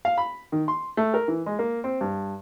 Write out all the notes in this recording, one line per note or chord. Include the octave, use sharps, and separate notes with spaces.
F5
B5
D#3
C6
A3
A#4
E3
G#3
A#3
C4
G2